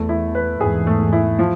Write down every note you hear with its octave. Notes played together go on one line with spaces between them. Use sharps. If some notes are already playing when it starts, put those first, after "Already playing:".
Already playing: E2 A3
E4
B4
E2 G#2 G#4
A3
E4
F3